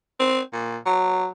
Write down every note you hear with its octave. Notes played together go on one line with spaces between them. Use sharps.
C4
A#2
F#3